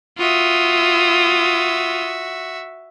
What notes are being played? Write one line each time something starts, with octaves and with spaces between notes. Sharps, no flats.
F4 F#4 E5 D#6